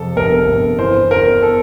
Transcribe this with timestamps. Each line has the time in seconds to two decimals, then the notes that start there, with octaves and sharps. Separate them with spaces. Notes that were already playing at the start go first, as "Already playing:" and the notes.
Already playing: F2 C3 A4
0.16 G1 A#4
0.48 G1
0.79 E3 C5
1.11 E2 A#4
1.42 A4